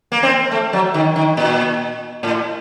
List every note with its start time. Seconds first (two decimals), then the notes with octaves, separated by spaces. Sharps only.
0.12 A#3
0.23 C4
0.51 A3
0.73 F#3
0.94 D#3
1.16 D#3
1.37 A#2
2.23 A2